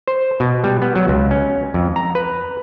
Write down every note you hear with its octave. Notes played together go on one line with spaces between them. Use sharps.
C5
B2
G3
B3
F#3
C#2
C#4
F2
A#5
B4